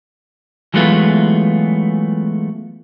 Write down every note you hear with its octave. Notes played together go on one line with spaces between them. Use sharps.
E3 F#3 G#3 A3 B3 F4